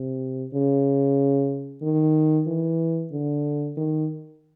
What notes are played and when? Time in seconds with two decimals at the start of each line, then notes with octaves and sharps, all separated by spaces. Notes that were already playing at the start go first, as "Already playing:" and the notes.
Already playing: C3
0.54 C#3
1.82 D#3
2.47 E3
3.12 D3
3.77 D#3